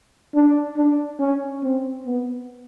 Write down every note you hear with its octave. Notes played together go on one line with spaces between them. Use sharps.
D4
D4
C#4
C4
B3